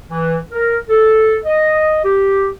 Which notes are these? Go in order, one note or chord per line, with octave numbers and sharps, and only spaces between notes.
E3
A#4
A4
D#5
G4